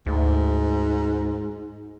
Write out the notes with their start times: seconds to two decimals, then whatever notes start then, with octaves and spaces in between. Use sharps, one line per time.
0.06 D2 G#2